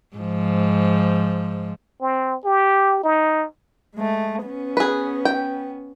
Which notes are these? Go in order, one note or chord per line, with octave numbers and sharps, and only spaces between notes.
G#2 F3
C4
G4
D#4
G#3 A3
B3 C#4
G#4 B4
G5